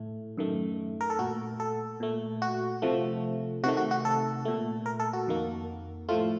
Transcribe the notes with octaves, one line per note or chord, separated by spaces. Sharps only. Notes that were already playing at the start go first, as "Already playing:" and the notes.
Already playing: A2 A3
F#2 D#3 A3
A#4
A4
A#2 A3 F#4
A4
A#2 A3
F#4
C3 F3 A3
C3 D#3 A3 F#4
F#4
F#4
A4
A#2 A3
A#4
A4
F#4
F2 D#3 A#3
A2 F3 A3 F4